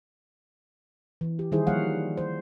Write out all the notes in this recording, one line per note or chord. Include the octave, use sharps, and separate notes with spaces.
E3
G4
D#3 G3 D#4 E4 G#4 C5
F3 G3 A#3 C#5 F5 F#5
C5